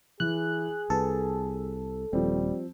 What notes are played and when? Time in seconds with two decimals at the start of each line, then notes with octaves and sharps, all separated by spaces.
0.20 E3 E4 G#4 F#6
0.90 C2 A4 B4
2.13 D#1 F3 G3 C4